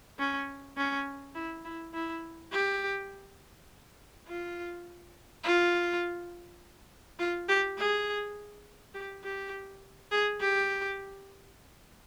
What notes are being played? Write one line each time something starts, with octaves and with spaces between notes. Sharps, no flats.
C#4
C#4
E4
E4
E4
G4
F4
F4
F4
G4
G#4
G4
G4
G#4
G4